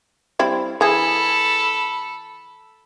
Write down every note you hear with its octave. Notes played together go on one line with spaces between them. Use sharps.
G3 C4 E4
E3 G#4 A4 B5